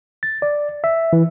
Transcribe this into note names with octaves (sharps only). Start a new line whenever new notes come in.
A6
D5
E5
E3